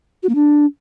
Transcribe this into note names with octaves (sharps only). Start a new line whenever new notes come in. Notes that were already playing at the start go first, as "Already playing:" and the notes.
F#4
A#3
D4